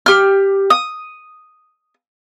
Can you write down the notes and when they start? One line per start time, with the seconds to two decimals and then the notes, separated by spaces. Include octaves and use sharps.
0.06 G4 F6
0.70 D#6